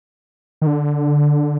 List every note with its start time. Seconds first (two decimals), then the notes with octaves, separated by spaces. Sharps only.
0.62 D#3
0.67 D3